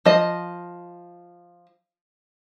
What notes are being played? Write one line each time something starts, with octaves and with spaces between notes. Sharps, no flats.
F3 D#5